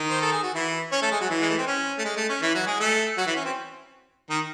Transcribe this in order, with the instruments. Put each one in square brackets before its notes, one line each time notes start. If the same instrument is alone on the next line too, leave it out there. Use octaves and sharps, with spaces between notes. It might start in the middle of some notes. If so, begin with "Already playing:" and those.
Already playing: [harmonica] D#3 D#4
C5
A4
G#4
F#4
E3 E4
C#4 C#5
A3 A4
G#3 G#4
F#3 F#4
E3 E4
G#3
A3
C4
C#4
A3
G#3
A3
C#4
E3 E4
F#3 F#4
G#3 G#4
A3 A4
F#3 F#4
E3 E4
C#4
C4
D#3 D#4